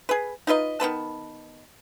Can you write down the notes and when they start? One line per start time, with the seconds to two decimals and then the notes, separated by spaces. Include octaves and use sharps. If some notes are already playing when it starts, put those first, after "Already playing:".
0.09 G#4 B4
0.47 D#4 F4 B4 D#5
0.80 D#3 B3 B4 A5